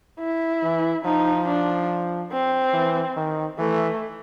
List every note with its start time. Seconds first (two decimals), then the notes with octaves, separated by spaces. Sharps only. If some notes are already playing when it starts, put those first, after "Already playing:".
0.20 E4
0.63 E3
1.04 F3 D#4
1.48 D4
2.32 C4
2.74 E3
3.17 D#3
3.59 E3 A3